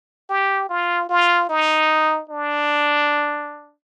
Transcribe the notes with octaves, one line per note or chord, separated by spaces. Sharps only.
G4
F4
F4
D#4
D4